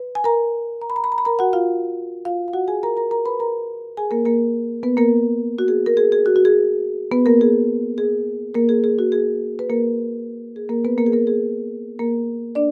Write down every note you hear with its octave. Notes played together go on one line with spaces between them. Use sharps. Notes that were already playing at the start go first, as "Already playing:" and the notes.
Already playing: B4
G#5
A#4 A#5
A#5
B5
A#5
B5
A#5
B5
A#4 A#5
F#4 F#5
F4 F5
F4 F5
F5
F#4 F#5
G#4 G#5
A#4 A#5
A#4 A#5
A#4 A#5
B4 B5
A#4 A#5
G#4 G#5
A#3 A#4
A#3 A#4
B3 B4
A#3 A#4
F#4
G#4
A#4
G#4
G#4
F#4
F#4
G#4
B3 B4
A#3 A#4
G#4
G#4
A#3 A#4
G#4
G#4
F#4
G#4
B4
A#3 A#4
G#4
A#3 A#4
B3 B4
A#3 A#4
G#4
A#3 A#4
G#4
A#3 A#4
D4 D5